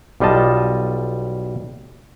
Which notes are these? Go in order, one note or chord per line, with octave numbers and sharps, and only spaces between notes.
B1 G3 F4 D#5 A5